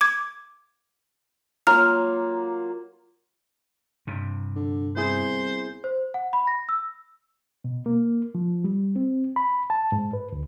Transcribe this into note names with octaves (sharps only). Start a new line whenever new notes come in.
D6 G#6
F#3 A#3 F4 A#5 F6
G2 C3
D3
C2 B3 E4 G#4 C5
C5
F#5
B5
A#6
E6
B2
A#3
F3
G3
C4
B5
A5
G#2
B4
D2